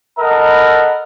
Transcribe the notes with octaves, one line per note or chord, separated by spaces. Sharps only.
A4 A#4 D#5 F#5 A#5 B5